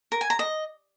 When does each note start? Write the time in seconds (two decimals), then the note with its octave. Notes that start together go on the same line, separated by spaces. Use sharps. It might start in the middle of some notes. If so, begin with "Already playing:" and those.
0.12 A#4
0.21 G#5
0.30 A#5
0.39 D#5